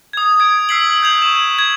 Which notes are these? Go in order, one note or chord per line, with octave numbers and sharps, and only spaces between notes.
D#6 G#6
G#6 D7
E6 F#6 B6 C7 D7 F#7
G6 G#6 F7 F#7
C#6 E7
G#6